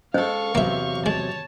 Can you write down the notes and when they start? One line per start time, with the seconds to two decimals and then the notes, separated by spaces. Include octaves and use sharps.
0.14 G#3 C#4 A4 C5 D#5 F5 C#6
0.55 E2 C3 F#3 A#3 E5
1.06 G#3 C#5 A5